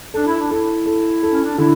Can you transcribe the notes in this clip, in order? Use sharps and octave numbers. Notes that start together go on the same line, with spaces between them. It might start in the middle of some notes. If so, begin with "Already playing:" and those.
D4 A4
E4
D4
E4 A4
A4
A4
C#4
D4
D3 E4